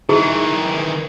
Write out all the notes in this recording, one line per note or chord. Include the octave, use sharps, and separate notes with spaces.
D#3 E3 E4 G#4